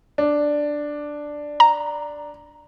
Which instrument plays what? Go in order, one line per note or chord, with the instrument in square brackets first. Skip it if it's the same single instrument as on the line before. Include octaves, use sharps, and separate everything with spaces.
[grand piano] D4
[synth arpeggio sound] A#5